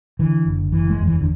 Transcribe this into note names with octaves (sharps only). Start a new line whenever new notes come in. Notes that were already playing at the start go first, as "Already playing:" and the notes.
D3 E3
F#1
F#1 E3
G#3
E2
E3
D3